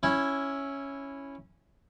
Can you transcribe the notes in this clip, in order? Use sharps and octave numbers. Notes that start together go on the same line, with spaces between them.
C#4 E4